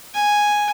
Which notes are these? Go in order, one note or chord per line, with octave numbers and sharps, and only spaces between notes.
G#5